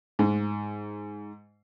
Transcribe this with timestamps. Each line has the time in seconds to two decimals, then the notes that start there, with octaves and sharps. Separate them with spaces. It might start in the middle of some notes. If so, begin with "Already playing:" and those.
0.19 G#2